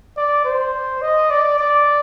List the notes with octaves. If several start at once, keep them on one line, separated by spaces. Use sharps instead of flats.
D5
C5
D#5
D5
D5